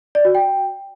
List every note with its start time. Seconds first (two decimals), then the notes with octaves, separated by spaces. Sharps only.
0.15 D5
0.25 F#4
0.35 G5